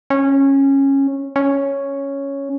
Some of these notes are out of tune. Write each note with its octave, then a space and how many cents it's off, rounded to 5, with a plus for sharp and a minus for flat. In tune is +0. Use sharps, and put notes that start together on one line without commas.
C#4 -15
C#4 +0